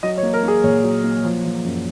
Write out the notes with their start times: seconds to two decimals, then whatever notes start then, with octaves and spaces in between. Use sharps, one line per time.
0.03 F#3 D#5
0.18 C#5
0.23 A#3
0.34 A#4
0.43 A#3 G#4
0.64 A#2 C#5
0.84 F#3
1.04 A#3
1.24 F3
1.45 F3
1.65 F#2